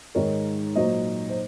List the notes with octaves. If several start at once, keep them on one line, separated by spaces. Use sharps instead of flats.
G#2 D#3 G#3 A#4 C#5
A#2 F#3 A#3 C5 D#5
C5